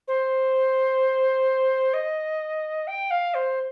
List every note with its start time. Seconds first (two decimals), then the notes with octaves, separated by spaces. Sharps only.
0.08 C5
1.94 D#5
2.87 G5
3.11 F5
3.34 C5